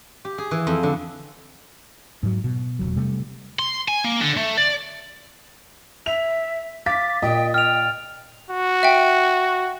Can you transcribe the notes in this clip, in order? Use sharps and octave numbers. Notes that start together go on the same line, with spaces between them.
G4
G#4
E3
F2
D3
G#2 F#3
B2
E1 A#1 F#3
C3 G3 A3
C6
G#5
A#3
D3
A3
D5
E5 F7
F5 D6 A6 B6
A#2 D#5 G5
G5 F6 F7
F#4
E5 G5